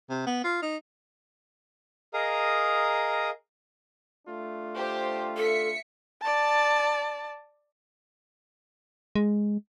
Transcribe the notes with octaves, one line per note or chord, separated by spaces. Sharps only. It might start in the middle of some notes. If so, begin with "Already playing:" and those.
C3
B3
F4
D#4
G#4 A#4 D#5 F5 A#5 D#6
A3 D4 F4
G4 C5
A4 E5 B6 C#7
D5 A5
G#3